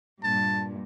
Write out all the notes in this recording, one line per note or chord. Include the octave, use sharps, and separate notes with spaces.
G2 A#2 A5